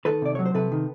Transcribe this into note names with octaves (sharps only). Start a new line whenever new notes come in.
D#3 A4 B4
C3 D5
F#3 C#5
C5
C3 A4 B4
D#3